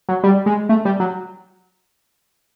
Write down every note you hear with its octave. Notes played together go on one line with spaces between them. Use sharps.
F#3
G3
G#3
A3
G3
F#3